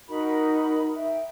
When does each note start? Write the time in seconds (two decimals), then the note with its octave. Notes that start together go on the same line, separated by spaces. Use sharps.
0.08 D#4 F#4 A#4 B5
0.95 E5 G5